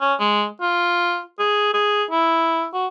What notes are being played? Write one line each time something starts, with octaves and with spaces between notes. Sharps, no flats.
C#4
G#3
F4
G#4
G#4
E4
F#4